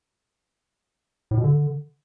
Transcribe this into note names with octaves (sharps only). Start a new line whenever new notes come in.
A2
B2
D3